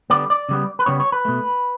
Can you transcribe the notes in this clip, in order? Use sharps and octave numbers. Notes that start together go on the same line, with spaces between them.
D3 G3 B3 D5
D5
C#3 G3 B3
B4
C#3 G3 B3 C#5
C#5
B4
B2 A3